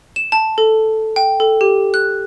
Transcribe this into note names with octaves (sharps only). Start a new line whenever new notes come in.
E7
A5
A4
G5
A4
G4
F#6